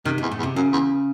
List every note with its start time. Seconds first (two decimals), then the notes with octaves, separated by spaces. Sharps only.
0.05 C3 D#3
0.18 E2 G#2
0.31 A2
0.39 E2
0.43 C3
0.56 F#2 C#3
0.73 E2